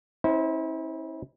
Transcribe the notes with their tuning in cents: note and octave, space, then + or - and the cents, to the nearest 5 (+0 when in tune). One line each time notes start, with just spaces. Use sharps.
C#4 -45 E4 -35 C5 -10